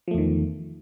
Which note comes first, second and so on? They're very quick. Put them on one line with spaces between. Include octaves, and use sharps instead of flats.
F3 A3 E2 D#3